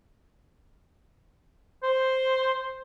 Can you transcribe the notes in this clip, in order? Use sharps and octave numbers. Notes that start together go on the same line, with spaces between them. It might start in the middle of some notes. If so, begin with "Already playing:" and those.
C5